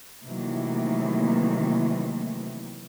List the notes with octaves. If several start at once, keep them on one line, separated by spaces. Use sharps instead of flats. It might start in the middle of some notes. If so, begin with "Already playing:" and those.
C3 D#3 E3 F#3 A3 A#3